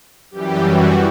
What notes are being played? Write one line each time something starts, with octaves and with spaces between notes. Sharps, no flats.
F#2 E3 G3 G4
F#4